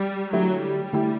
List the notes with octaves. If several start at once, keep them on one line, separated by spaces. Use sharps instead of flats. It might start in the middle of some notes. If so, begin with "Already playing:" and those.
Already playing: G3
D3 F#3 A3 E4 G4
G3
D3 A3 E4 G4